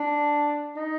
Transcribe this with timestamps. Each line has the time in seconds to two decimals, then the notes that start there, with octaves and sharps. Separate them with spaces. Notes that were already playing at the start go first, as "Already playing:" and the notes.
Already playing: D4
0.76 D#4